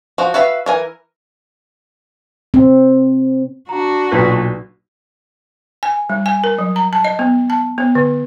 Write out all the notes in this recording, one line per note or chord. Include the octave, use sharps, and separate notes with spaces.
F3 F#4
F#4 B4 E5 F5
E3 A#4 G#5
C4
D4 F#4 A#5
B1 A#2 B4 C#6 B6
G#5
G3
G#5
A#4
F#3
A#5
A5
D#5
B3
A5
B3
D3